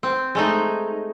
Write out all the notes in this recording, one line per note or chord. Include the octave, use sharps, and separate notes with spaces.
C4
G#3 A3 D#4